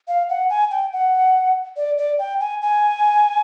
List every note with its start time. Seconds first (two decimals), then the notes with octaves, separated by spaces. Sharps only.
0.08 F5
0.29 F#5
0.50 G#5
0.71 G5
0.93 F#5
1.77 D5
1.98 D5
2.19 G5
2.40 G#5
2.62 G#5